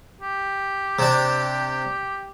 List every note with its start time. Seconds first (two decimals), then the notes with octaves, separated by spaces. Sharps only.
0.21 G4
0.99 C3 D4